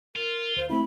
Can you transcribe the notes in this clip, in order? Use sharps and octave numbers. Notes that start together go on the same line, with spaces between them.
F4 A#4
D2 C5
A3 C4 E4 B5